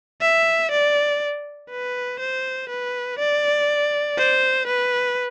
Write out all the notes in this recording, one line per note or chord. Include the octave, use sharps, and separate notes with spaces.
E5
D5
B4
C5
B4
D5
C5
B4